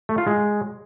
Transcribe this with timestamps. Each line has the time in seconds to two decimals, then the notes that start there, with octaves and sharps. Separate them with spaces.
0.09 A3
0.18 F4
0.27 G#3